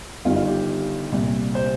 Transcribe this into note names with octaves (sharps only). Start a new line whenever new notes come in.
G1 G2 D#3 F4
F4
G4
C2 A#2
C5